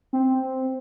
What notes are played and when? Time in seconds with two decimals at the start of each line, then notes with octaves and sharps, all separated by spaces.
0.13 C4